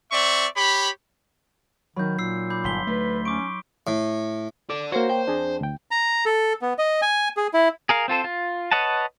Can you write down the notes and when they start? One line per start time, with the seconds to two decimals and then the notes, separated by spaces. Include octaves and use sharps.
0.12 C4 D5 E5 C#6
0.56 G4 C#5 B5
1.96 D#3 F#3 D#4 B5 G6
2.19 A#2 E6 C7
2.50 B5 D6 G6
2.64 G1 C6 B6 G7
2.87 D2 A3 B4
3.25 C#4 C#6 D6 D7
3.87 A2
4.70 A4 D5 D6
4.92 A#3 F#4 C5 C#5 F#5
5.10 G5
5.28 F2 D4 G#4
5.61 D2 G5
5.91 A#5
6.26 A4
6.62 B3
6.78 D#5
7.02 G#5
7.37 G#4
7.54 E4
7.89 G#4 A#4 F5
8.08 C4 F4 A4 C5
8.24 F4
8.71 B4 C#5 D#5 F#5 A5